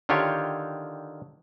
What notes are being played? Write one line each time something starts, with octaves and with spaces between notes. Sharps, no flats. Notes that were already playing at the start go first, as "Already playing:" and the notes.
D3 D#3 F4 G4 C#5